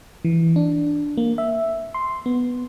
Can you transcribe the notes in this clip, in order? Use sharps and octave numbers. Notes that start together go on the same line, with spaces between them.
E3
D4
A#3
E5
C6
B3